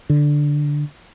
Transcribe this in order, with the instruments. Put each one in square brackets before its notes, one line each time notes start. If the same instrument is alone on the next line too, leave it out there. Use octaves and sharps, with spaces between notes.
[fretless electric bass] D3